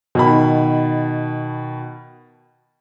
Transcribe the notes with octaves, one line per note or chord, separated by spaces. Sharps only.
B2 D#3 B5